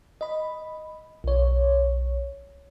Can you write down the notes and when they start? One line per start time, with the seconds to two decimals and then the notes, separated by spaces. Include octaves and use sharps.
0.21 D#5 B5
1.24 B1 C#5